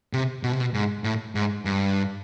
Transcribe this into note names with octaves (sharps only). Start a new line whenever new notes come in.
C3
B2
C3
B2
G#2
A2
G#2
G2